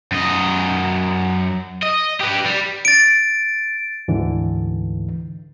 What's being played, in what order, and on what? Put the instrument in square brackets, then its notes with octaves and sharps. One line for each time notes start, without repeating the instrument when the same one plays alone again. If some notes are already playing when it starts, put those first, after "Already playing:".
[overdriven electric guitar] F#2 D#5
D#5
G4 B4
G3
[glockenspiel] A6 D7
[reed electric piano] D2 G#2 D3 E3